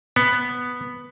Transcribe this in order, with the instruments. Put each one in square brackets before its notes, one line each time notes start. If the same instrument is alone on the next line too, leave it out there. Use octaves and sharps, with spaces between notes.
[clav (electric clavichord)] B3